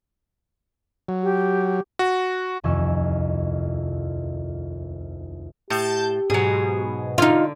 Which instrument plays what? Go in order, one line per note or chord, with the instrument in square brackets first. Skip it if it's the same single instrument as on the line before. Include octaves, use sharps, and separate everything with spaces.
[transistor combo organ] F#3
[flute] G4
[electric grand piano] F#4
[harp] D#1 C2 F2 G#5 C#6 E6
[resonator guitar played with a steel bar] A2 [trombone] G4 [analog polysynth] A5 G6
[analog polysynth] G#2 B2 [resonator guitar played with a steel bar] F#3 G#4
[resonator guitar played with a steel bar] D3 [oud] D#4 F4